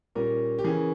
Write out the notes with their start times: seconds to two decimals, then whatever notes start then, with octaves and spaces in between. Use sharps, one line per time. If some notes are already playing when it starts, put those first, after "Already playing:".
0.15 A#2 G3 C#4 A#4
0.59 G4
0.64 C#3 E3 A#3 C#4 G#4